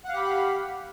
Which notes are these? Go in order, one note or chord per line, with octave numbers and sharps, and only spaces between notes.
G4 F5 F#5 B5